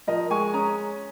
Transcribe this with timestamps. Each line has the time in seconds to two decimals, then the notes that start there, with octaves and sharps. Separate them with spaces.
0.07 F3 A#4 D#5
0.30 G#3 G#5 C#6
0.54 C#4 A#5 D#6